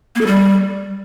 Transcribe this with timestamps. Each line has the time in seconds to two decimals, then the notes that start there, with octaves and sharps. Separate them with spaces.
0.15 A#3
0.21 A4
0.27 G3